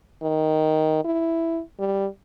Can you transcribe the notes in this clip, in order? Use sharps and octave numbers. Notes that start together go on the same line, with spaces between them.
D#3
E4
G3